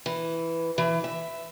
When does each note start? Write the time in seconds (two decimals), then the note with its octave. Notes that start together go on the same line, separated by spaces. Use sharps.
0.06 E3
0.78 E3
1.04 E5